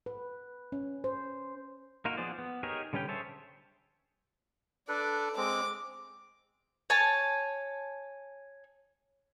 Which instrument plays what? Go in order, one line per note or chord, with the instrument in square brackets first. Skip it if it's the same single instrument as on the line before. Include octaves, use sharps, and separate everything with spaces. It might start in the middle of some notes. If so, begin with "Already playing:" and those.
[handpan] B4
C#4
C5
[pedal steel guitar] A#3 D#4 F4 F#4 A#4
F3 B3 G#4 C5 D5
B3
D#4 G4 G#4 A#4 C#5
D3 G3 C#4 B4 G5
G#4 C5 C#5 E5 A5
[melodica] D4 A4 B4 [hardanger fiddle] D5
[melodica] G#3 C4 [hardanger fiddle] D6
[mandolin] C#5 G#5 A5